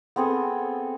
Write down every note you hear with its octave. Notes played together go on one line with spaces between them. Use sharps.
B3 C4 G#4 A4